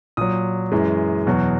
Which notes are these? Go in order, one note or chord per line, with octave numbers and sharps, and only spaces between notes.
A#2 F#3 D#6
F#2 E3 G#3
E2 B2 F#3